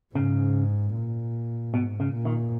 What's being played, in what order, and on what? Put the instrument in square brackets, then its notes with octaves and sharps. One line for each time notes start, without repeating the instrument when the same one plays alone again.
[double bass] G#2 [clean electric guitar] C#3
[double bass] A#2
[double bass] G#2 [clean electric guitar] B2
[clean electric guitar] C#3
[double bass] A#2
[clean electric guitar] D#3